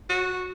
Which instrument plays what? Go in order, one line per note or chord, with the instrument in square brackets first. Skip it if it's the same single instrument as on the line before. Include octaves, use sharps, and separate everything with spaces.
[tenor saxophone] F#4